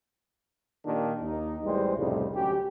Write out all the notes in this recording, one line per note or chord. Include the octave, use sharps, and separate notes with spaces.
A#2 D#3 A#3 D4 G4 A#4
D#2 D#4
A1 E3 G3 G#3 C5
C2 F2 A2 C#3 G3 D#4
D2 F#3 C#4 G4